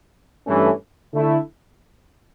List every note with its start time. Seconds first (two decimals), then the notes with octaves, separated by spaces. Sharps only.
0.46 G2 E3 A3 C#4
1.13 D3 A3 E4